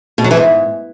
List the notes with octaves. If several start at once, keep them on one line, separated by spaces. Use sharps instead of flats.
B2
F#3
E3
G#2